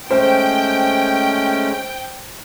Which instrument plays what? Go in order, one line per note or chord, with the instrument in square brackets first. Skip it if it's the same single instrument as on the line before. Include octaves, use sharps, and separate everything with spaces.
[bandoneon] G#3 A3 C#4 [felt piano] C5 [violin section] G5